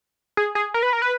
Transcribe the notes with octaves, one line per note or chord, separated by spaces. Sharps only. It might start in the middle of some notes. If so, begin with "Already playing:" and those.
G#4
G#4
A#4
B4
A#4
B4